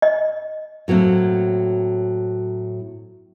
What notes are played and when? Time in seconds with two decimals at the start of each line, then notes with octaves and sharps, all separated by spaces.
0.02 D#5
0.88 A2 F#3 A#3 C4